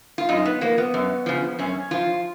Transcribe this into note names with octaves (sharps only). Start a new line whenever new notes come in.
F4
F#2 D#4
B3
F3 A#3
B3
F#2
C#3 F3
F#2 C#4
F3 F4